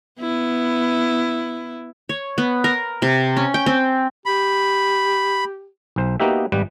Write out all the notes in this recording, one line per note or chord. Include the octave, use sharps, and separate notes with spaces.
B3 E4
C#5
B3
A#4
C3
C#4
G5
C4
G4 B5
B1 C5
A#3 B3 D#4 F#4 G4 E5
G#1 G3 G4 B4